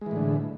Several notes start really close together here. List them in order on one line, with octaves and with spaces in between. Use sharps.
G#3 E3 A2 D3